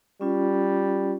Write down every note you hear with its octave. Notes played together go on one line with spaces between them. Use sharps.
G3 C#4 F4